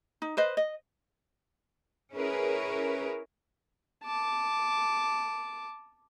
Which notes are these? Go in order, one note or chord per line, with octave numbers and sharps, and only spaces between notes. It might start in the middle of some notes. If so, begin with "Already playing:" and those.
D#4
B4 C5 D#5
D#5
C#4 E4 G#4 A#4 B4 C#5
A5 D6